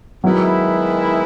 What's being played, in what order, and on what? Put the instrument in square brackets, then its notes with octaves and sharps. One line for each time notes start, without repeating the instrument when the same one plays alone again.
[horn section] D#3 G#3 B3 E4 [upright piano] F#3